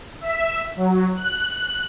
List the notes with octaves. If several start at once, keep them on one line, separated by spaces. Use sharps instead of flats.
E5
F#3
F#6